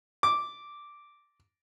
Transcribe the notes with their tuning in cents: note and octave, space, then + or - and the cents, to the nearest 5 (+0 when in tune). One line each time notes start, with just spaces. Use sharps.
D6 -5